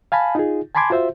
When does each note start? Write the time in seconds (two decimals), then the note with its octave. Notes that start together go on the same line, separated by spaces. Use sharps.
0.12 F5 G#5 A5 B5
0.35 D#4 F4 G#4
0.75 G#5 A5 B5 C6 D6 G#6
0.90 F4 F#4 C5 E5